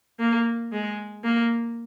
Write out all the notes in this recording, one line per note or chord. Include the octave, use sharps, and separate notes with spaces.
A#3
G#3
A#3